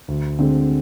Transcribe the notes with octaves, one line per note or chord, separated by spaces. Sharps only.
D2
D3 G#3 C4